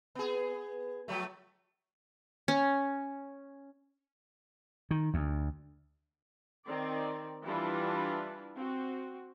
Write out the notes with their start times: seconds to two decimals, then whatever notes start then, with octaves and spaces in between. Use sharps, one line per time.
0.15 B3 G#4
1.08 F3 F#3 A3
2.48 C#4
4.91 D#3
5.14 D2
6.65 D#3 C4 D5
7.44 E3 G3 D4 E4 F4 B4
8.56 C4 F#4